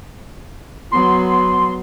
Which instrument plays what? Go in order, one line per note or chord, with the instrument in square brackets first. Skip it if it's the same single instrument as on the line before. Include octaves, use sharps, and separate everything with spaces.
[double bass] F#3 B3 [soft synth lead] C6